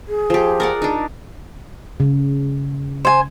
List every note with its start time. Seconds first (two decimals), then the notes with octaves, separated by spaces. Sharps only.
0.08 G#4
0.30 F3 G4
0.60 A#4 D5 F#5
0.82 D4 D#4
2.00 C#3
3.05 C5 G#5